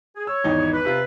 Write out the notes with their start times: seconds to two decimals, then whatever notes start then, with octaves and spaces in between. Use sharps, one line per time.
0.16 G#4
0.27 C#5 E6
0.44 G#1 E2 D#4
0.72 B4
0.85 C3 F4